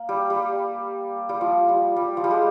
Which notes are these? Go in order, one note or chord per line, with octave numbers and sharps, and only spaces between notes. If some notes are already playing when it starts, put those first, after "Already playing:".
Already playing: A#3
G3
G3
G3
F3
G3
G3
F3
G3
G#3